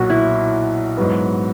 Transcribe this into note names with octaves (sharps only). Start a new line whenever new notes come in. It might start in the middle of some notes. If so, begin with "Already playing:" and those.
Already playing: B1 A#2 F#3 F#4
E4
G#2 F#3 B3